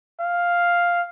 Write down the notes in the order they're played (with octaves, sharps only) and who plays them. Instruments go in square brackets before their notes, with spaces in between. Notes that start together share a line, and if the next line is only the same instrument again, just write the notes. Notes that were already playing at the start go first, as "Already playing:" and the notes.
[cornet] F5